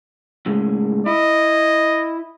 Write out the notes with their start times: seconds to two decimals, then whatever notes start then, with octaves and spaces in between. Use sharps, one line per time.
0.46 A2 C#3 G#3
1.06 E4 D#5